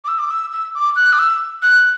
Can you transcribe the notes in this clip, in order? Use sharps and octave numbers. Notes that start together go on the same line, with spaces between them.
D6
E6
D6
E6
E6
D6
F#6
D6
E6
F#6